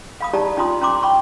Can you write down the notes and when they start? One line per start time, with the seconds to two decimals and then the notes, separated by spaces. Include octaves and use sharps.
0.21 F5 B5 D#6
0.33 D#4 E4 G4 D5 A5 A#5
0.57 C#4 D#4 F4 A#5 C6 D#6
0.82 C#4 A#5 C6 D6
1.03 G5 B5 C#6